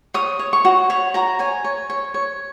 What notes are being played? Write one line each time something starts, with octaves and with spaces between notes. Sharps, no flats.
C#5 D#6
C#5
C#6
F#4
C#5 B5
F#4 A#5
C#5 G#5
C#5
C#5
C#5